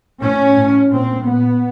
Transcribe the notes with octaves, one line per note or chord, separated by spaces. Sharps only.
A2 C#4
A2
A#2 C4
A#2 B3